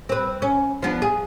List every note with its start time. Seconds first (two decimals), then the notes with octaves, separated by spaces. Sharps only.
0.09 C4 B4
0.42 C#4
0.82 F3 B3 D4
1.02 G#4